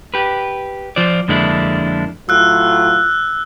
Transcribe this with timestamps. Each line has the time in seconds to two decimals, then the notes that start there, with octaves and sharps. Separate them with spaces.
0.14 G4 B4
0.96 F3 F4 C5 D5
1.28 F2 D3 G#3 A#3 D4 E4
2.29 A2 F#3 F4 E6 F#6